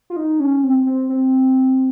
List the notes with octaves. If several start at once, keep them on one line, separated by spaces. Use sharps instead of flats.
F4
D#4
C#4
C4
C4
C4